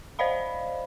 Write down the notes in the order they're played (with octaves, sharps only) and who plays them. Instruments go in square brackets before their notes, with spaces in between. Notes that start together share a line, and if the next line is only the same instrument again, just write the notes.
[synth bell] C5 D5 D#5 F5 B5